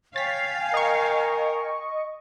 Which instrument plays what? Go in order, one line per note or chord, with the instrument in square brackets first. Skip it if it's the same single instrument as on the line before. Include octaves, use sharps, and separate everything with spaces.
[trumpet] C#5 [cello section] F5 [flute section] G5 G#5 [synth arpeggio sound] A6 B6
[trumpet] A#4 [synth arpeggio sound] D#5 C#6